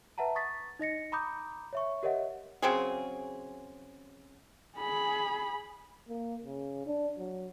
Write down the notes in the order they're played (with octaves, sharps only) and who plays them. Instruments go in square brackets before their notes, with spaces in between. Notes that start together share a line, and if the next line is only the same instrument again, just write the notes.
[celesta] B4 E5 F#5 A5 A#5
C#6 D#6 A6 B6
D#4 D#5 A#6 C#7
A#5 B5 D6 D#6 G6
C#5 E5 C#6
G4 A#4 C#5 D#5 E5 F#5
[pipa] C#3 F#3 C4 G#4
[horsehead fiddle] G#4 B5
[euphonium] A#3
C#3
D4
F#3